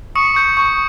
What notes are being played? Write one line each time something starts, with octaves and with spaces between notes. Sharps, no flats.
C#6 D#6 C#7
G6
C#6